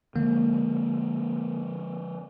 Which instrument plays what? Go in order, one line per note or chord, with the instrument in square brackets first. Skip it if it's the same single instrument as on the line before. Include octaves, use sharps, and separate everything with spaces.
[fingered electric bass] D3 F3 G#3 [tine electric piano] A#3